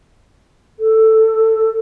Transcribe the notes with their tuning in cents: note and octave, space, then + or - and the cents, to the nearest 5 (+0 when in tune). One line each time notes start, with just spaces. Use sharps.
A4 +10